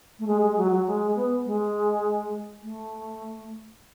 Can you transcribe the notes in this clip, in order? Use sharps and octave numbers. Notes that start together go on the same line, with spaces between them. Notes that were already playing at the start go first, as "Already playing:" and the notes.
A3
G#3
G#3
F#3
F#3
G#3
B3
G#3
A3